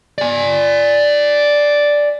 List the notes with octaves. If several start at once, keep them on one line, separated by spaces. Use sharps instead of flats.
D5 G#5